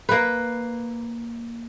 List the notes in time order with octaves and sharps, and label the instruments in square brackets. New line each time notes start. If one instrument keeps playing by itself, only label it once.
[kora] A#3 B4